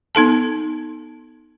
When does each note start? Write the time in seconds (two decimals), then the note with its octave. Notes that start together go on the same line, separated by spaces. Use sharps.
0.15 B3 D#4 A4 A5